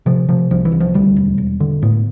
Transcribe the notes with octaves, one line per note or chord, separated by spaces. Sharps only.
C3 F3
C3 F3
C2 F3
E3
C2
F3
D2 G3
E1
E1
D3
A2 B3